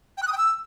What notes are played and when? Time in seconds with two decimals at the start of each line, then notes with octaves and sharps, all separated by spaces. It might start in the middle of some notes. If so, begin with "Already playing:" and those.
0.17 G5
0.22 F#6
0.27 D#6
0.32 G5
0.37 E6